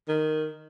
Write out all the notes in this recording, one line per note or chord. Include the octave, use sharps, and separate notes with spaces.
D#3